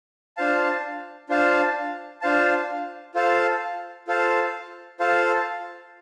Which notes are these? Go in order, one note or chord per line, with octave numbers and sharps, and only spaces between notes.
D4 F4 C5 F5 A5
D4 F4 C5 F5 A5
D4 F4 C5 F5 A5
F4 A4 C5 F5 A5
F4 A4 C5 F5 A5
F4 A4 C5 F5 A5